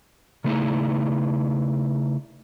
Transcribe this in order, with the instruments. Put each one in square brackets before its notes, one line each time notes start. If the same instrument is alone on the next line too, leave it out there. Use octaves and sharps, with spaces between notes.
[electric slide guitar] C#3 A3 D#4 E4